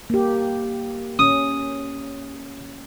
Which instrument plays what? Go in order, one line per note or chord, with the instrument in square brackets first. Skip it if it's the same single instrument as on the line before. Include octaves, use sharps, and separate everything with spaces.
[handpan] A#3 G4
[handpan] C#4 [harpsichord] D#6